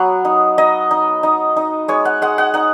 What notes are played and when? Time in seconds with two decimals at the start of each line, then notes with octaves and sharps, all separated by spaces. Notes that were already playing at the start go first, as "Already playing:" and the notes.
Already playing: F#3 B3 F#5
0.25 D#4
0.58 D#4 D#5
0.91 D#4
1.23 D#4
1.57 D#4
1.88 G#3 C#5
2.05 F#5
2.22 G#3 F#5
2.38 F#5
2.54 D#4 F#5